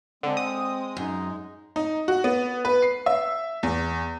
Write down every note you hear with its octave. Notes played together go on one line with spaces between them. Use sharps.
D3 G#3 C4
D#6
F#2 D#4
D#4
F#4
B3
B4
C7
E5
E2